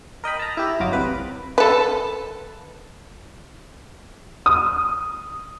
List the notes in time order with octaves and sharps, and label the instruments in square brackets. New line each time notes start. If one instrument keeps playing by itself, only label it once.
[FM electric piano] A#4 D#5 G5 B5
A5 A#5
E4 G4
G1 F#3 F4 D#5 A#5 D6
C2 B4
[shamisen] A4 B4
[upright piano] D#6